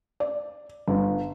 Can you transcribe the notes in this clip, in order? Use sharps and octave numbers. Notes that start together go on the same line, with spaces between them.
D5
G1